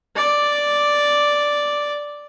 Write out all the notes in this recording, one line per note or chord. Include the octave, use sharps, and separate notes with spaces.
D5